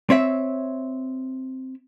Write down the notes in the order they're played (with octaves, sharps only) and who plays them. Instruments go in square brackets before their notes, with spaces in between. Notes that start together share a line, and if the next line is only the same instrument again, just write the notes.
[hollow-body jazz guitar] C4 C#5 E5